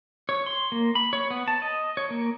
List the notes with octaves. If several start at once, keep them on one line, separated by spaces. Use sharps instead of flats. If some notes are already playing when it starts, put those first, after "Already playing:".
C#5
C6
A#3
B5
C#5
B3
A5
D#5
C#5
A#3